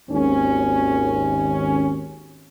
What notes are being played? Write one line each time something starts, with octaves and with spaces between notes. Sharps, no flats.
G#1 D#2 C#4